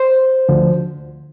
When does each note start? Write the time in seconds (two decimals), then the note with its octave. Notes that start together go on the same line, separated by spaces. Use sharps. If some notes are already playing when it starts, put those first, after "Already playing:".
Already playing: C5
0.49 D2 D3 F3